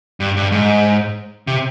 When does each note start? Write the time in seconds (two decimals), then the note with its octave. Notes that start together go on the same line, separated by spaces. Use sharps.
0.20 G2
0.36 G2
0.52 G#2
1.47 C3